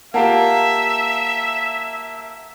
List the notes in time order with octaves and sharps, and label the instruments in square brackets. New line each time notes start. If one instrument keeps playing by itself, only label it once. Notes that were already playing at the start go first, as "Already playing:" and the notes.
[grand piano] A#3 F4 G4 [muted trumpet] E5 [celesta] F#5 A5 A#5